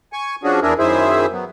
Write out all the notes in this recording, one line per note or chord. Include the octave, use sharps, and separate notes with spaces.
G#5 C#6
F3 C#4 D4 F#4 G#4
E2 D4 E4 G#4 A#4
F#2 D#3 E4 G#4 C5 E5
F#3 B3